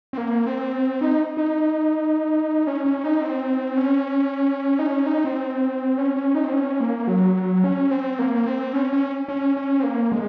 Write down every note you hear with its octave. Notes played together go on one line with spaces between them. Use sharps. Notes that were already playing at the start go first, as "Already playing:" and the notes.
C4
A#3
C4
D#4
D#4
C#4
C#4
D#4
C4
C#4
D#4
C#4
D#4
C4
C#4
C#4
D#4
C4
C#4
A#3
F#3
C#4
C4
A#3
A#3
C4
C#4
C#4
C#4
C#4
C4
A#3
G#3